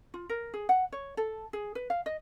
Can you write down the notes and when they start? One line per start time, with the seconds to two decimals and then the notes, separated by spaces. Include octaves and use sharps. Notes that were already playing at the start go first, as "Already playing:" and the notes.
0.14 F4
0.29 A#4
0.54 G#4
0.69 F#5
0.92 C#5
1.17 A4
1.53 G#4
1.75 B4
1.90 F5
2.06 D#5